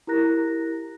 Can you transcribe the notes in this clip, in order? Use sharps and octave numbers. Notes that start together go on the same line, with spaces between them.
E4 G4 A#4 A#5 F#6 A#6